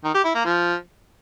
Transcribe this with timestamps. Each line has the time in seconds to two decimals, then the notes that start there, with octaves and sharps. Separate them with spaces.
0.04 D#3
0.14 G4
0.24 E4
0.34 A#3
0.45 F3